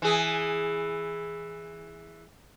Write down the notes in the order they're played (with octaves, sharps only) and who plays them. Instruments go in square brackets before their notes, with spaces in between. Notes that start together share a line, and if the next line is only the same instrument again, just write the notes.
[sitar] E3 G#4